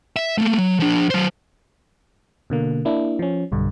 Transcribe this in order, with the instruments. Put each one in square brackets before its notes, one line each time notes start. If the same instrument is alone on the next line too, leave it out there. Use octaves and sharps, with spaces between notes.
[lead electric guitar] E5
A3 A#3
F#3
F3 D4
F#3 C5
[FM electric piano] B2 D3 A#3
A#3 D4 E4
F3 C#4
B1 G2 D3